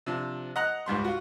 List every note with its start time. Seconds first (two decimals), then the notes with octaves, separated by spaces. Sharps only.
0.06 C3 F3 D4
0.56 D#5 F#5 A#5 F#6
0.86 C#2 G#2 G3 C6
1.04 F4 F#4